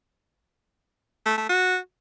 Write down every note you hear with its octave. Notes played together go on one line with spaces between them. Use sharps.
A3
A3
F#4